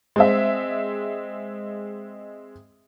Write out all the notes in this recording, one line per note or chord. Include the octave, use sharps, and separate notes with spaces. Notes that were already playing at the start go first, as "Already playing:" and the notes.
G#3 C4 E5